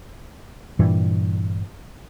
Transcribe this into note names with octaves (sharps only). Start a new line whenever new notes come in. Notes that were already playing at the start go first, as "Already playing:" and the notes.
G2 A#2 E3 G3